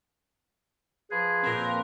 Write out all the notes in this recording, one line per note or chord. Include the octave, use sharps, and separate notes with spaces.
F3 G#4 B4
A#2 C4 A#4